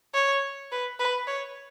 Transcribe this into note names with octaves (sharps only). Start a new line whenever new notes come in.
C#5
B4
B4
C#5